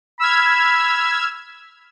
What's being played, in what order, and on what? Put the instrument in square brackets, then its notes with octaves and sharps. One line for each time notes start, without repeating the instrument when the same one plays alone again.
[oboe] B5 [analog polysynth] E6 F6 G#6